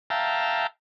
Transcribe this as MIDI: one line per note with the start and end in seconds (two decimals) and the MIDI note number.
0.10 0.67 76
0.10 0.67 77
0.10 0.67 79
0.10 0.67 81
0.10 0.67 82